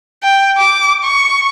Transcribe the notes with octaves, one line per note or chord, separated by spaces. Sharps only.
G5
D6
C#6